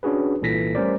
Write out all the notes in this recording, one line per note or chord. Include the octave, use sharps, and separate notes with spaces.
C#4 D4 F#4 G#4 B4
C2 A#2 E3 A4 A#6 B6
G3 A3 C#4 A#4 C5 D5